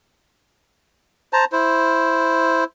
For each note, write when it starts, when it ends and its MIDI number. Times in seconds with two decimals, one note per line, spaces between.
1.33 1.45 72
1.33 1.45 81
1.33 1.45 82
1.52 2.64 64
1.52 2.64 72